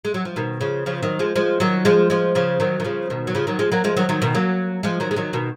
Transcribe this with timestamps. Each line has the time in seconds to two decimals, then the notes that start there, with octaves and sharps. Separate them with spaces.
0.05 G#3
0.14 F#3
0.25 F3
0.36 B2 D#3
0.61 C#3 F3
0.86 C#3 F3
1.03 D#3 F#3
1.19 F3 G#3
1.36 F3 G#3
1.60 D#3 F#3
1.85 F3 G#3
2.10 F3 G#3
2.35 C#3 F3
2.60 D#3 F#3
2.80 D#3
2.84 C#3 F3
3.10 B2 D#3
3.27 F#3
3.35 C#3 F3
3.47 D#3 F#3
3.59 F3 G#3
3.72 F#3 A#3
3.84 F3 G#3
3.97 D#3 F#3
4.09 D#3 F#3
4.22 B2 D#3
4.35 F#3 A#3
4.83 F3 G#3
5.00 D#3 F#3
5.11 G#3
5.16 D#3 F#3
5.33 B2 D#3